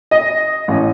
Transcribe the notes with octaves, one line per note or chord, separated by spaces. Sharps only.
D#5
A1